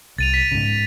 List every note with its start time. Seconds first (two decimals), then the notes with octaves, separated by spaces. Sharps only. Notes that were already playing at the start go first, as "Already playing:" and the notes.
0.18 C2 A6 D#7 F7
0.34 B6 D#7
0.52 G#2 C#3